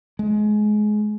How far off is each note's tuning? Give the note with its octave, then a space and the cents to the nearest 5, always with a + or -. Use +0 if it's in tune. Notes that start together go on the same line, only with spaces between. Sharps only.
G#3 +25